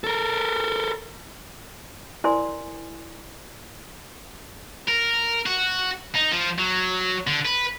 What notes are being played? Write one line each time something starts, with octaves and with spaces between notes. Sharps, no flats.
A4 A#4
E4 A#4 C5 D5 G#5 C6
A#4
F#4
D#4
F3
F#3
D3
B4